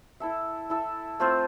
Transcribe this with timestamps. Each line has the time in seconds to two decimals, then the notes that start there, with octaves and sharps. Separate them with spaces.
0.20 E4 A4 E5
0.70 E4 A4 E5
1.20 A3 C4 F4 C5